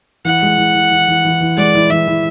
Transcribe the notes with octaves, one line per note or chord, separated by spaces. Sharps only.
E3 F#5
G#3
E3
E3
E3
E3
E3
E3
G#3 D5
E3
E3 E5
E3